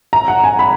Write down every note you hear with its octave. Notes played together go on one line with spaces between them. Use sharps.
A#5
F#5
G#5
B5